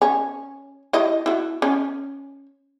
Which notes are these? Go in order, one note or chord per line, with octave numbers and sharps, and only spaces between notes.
C#4
E4 G4 D#5
E4 F#4
C#4